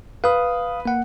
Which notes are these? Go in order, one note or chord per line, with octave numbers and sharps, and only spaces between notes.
B4 F5 D#6
A#3 F#5